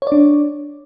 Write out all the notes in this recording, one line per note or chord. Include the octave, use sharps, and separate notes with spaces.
D4 C#5 D5